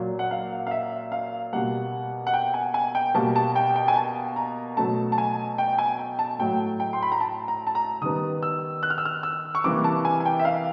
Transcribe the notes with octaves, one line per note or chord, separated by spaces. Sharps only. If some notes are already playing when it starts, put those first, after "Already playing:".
Already playing: A#2 F#3 A#3
F#5
F5
F5
E5
F5
B2 G3 A#3 F#5
F#5
G5
G#5
G#5
G5
B2 G3 A#3 A5
A5
G5
G5
G#5
A5
A#5
B2 F#3 A3 A5
A5
G#5
G5
G#5
G5
A5
A2 F#3 A3 G5
G5
C6
B5
A#5
A5
A#5
A5
A#5
D#3 G3 B3 D#6
E6
F#6
F6
E6
F6
E6
C#6
C3 E3 G3 A#3 D6
A5
G#5
G#5
G5
E5
F5